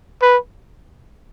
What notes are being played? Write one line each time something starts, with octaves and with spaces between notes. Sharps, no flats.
B4